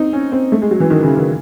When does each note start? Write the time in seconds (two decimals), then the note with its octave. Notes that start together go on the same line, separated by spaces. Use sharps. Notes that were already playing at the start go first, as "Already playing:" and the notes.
Already playing: C4 D#4
0.13 C#4
0.32 C4
0.52 A3
0.62 G#3
0.71 F#3
0.80 E3
0.90 D#3
1.03 C#3
1.16 D#3